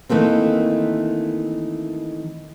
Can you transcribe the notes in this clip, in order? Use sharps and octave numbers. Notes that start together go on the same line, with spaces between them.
D#3 E3 A3 A#3 C4